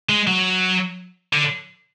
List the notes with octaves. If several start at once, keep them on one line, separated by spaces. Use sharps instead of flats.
G#3
F#3
D3